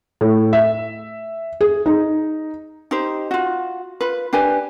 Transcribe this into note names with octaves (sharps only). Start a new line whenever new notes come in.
A2
E5
G#4
D#4
D#4 G4 C5
F4 F#4
F4 B4
D4 G4 B4 G#5